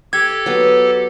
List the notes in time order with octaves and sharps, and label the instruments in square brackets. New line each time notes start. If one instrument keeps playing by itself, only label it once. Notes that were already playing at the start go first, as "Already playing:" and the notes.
[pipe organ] G4 A4 [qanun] G5 [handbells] G#6
[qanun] F#3 B3